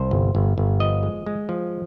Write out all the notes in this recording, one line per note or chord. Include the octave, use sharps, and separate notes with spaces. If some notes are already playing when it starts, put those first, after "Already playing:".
Already playing: C2 C5
G1
G1
G1
F3 D#5
G#3
G#3
F3